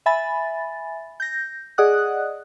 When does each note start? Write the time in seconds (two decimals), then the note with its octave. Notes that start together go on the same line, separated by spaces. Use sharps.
0.06 E5 G#5 B5 A6
1.20 G6 A#6
1.78 G#4 D5 D#5 F#5 D#6 F#6